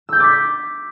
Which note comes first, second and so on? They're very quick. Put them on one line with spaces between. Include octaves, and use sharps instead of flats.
E6 G6 A6 D6 B6